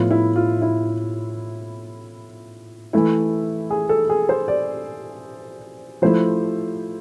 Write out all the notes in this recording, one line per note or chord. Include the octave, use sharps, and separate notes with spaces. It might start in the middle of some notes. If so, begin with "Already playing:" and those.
Already playing: A2 F3 B3 E4 F4
E4
F4
E4
E3 A3 E4
G#4
A4
G#4
C5
D5
F3 A3 E4 C5